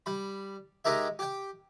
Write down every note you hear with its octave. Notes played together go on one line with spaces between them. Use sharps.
G3 B5
G#3 D#4 G4 A#4 E5
G4 G5